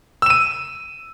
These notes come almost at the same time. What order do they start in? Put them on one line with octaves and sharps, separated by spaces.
E6 E7 D#7